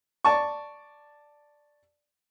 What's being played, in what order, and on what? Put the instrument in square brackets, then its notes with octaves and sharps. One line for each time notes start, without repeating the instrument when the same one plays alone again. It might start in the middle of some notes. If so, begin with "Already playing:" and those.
[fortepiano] D5 A5 C#6